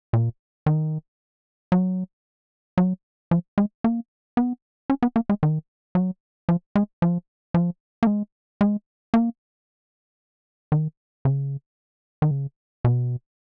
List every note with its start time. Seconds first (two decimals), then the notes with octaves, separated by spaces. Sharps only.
0.13 A#2
0.66 D#3
1.72 F#3
2.78 F#3
3.31 F3
3.58 G#3
3.84 A#3
4.37 B3
4.90 C#4
5.03 B3
5.16 A#3
5.29 G#3
5.43 D#3
5.95 F#3
6.49 F3
6.76 G#3
7.02 F3
7.54 F3
8.03 A#3
8.07 G#3
8.61 G#3
9.14 A#3
10.72 D#3
11.25 C#3
12.22 D#3
12.31 C#3
12.85 B2